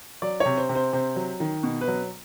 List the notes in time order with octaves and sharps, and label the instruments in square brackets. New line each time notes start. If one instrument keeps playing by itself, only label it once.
[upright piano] F#3 D5
C3 C#5
C5
C3
C5
C3 C5
F#3
D#3
B2
B4
F#3